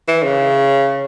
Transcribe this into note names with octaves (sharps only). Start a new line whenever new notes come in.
E3
C#3